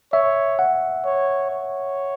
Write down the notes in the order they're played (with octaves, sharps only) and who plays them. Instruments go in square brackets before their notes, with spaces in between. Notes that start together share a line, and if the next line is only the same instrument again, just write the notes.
[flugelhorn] C#5 [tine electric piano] E5
[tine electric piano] F#5
[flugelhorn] C#5
C#5